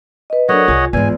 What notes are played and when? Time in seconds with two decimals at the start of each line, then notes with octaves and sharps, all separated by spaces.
0.30 B4 D#5
0.49 F#3 D4 A4 A#4 C#5 D#5 F#5
0.68 C2 F4 G#4
0.93 G#1 E2 G#3 G#5